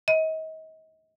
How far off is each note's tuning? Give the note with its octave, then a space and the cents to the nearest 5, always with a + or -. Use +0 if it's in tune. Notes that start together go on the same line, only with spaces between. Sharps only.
D#5 +35